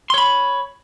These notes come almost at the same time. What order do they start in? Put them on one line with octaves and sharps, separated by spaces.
C6 C#5 B5